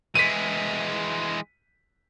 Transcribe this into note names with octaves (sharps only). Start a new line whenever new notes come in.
E3 G#3 B6 D#7